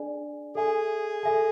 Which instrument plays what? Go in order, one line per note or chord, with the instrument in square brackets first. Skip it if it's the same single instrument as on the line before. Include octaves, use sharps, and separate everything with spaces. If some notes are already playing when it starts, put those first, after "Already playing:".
Already playing: [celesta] D4 G#4 D5 G#5
[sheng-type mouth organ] G#4 [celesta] A4 E5 G#5
[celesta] A4 E5 G#5